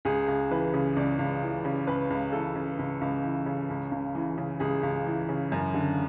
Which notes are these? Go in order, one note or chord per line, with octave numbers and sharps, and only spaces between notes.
C#2 G#4
C#2
E3 B4
C#3
C#2 D5
C#2
E3
C#3
C#2 B4
C#2
E3 A4
C#3
C#2
C#2
E3
C#3
C#2
C#2
E3
C#3
C#2 G#4
C#2
E3
C#3
F#2
D3